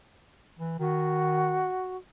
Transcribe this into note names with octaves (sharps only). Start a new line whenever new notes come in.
E3
D#3 F#4